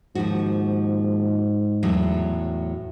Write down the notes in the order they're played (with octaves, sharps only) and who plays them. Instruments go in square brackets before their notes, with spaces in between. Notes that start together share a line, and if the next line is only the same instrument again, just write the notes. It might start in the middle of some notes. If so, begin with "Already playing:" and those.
[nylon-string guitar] D#2 F3 F#4 [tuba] G#2
[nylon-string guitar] E2 A2 F#3